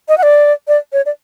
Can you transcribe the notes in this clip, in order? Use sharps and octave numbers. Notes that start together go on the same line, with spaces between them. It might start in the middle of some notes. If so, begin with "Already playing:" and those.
D#5
F#5
D5
D5
C#5
D5